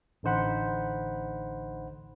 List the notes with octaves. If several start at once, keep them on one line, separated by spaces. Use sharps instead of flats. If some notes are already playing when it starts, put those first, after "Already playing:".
A1 D3 D#4 C5 F#5 B5